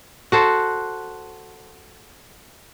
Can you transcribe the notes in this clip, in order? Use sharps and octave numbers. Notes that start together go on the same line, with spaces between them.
F#4 A4 C5